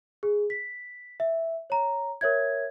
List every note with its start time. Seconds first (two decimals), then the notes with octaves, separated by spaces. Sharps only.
0.23 G#4
0.50 B6
1.20 E5
1.70 C#5 A#5
2.21 A#4 C#5 E5 G#6